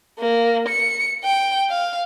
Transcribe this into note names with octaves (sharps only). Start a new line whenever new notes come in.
A#3
C#7
G5
F5